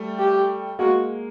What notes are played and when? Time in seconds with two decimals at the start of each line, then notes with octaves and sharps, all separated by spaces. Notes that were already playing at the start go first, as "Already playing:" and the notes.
Already playing: G3 A3
0.19 G4
0.79 G#3 A#3 F#4